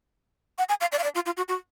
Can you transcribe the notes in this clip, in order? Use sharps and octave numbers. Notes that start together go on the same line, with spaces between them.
F#5
G#5
F5
D5
F5
D5
F4
F4
F#4
F#4